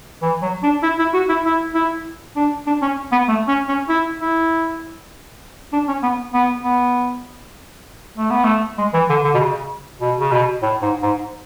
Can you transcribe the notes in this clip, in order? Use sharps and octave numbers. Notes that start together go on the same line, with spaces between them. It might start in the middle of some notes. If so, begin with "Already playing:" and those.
E3
F#3
D4
E4
E4
F#4
E4
E4
E4
D4
D4
C#4
B3
A3
C#4
C#4
E4
E4
D4
C#4
B3
B3
B3
A3
B3
A3
G#3
E3
D3
D3
B2
C#3
B2
C#3
B2
A2
G#2
G#2